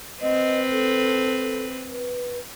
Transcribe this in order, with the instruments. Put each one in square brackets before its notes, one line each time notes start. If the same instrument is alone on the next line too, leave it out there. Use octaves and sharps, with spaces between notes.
[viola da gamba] C4 B4 [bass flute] D#5
[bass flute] A4
B4